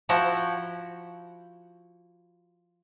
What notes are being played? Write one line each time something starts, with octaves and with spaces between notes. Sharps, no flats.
F3 E4 F#4 F#5 G5